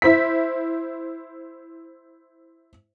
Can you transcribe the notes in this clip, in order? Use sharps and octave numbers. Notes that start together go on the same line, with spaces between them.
E4 C5 B6